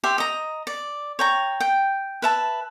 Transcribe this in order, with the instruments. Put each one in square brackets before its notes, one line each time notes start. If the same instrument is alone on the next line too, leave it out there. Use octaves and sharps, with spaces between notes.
[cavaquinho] G4 E5 C6
D#5 A#5
D5
C#5 G5 A#5
G5
B4 E5 A5